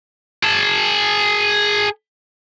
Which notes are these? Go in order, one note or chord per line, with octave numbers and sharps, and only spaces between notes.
G#4 A5